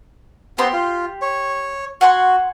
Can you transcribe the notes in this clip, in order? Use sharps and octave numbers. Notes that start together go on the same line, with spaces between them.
B3 C4 G4 C6
F4
C#5
F#4 F#5 G#5 C6